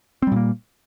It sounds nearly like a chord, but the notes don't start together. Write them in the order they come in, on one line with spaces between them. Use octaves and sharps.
C4 G3 A#2 A#3